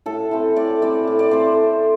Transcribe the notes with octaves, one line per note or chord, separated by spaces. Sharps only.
A2 A4
E3 A3 C4
A2 D5
E3 A3 C4 D5
A2
D5
A3 C4 C5